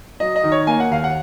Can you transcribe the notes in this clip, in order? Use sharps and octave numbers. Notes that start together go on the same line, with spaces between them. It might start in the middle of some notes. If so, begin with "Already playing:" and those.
F#3 D#5
D#5
D#3
C#5
A#3 G#5
F#5
D#2 F5
F#5